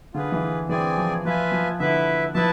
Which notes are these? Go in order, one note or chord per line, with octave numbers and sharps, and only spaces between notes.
D3 F4 G#4 B4
E3
E3 C4 G#4 D5 G#5
F3
F3 F4 B4 E5 G#5
F3
D3 E4 B4 E5
F3 E4 B4 E5 A5